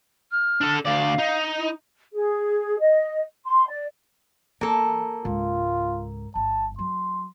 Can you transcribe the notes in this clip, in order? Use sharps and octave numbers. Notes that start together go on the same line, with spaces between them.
F6
D4 A4
D2 D5 F5
D#4
E4
G#4
D#5
C6
D5
E3 A#3 A4
C#2 G#2 F4
G1 A5
F#3 C6